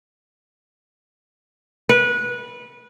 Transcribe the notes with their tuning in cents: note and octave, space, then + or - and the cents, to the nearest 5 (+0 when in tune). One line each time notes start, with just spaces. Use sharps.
B4 -20